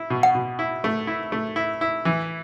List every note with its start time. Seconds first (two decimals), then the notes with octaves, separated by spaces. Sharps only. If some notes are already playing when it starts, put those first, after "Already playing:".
Already playing: E4
0.10 B2
0.23 F#5
0.35 B2
0.59 E4
0.84 A3
1.07 E4
1.32 A3
1.56 E4
1.81 E4
2.05 E3